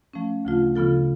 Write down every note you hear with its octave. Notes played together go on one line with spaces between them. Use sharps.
F3 A3 C#4
D2 C#3 F3 A3 F4
C#3 F3 B3 F4 A4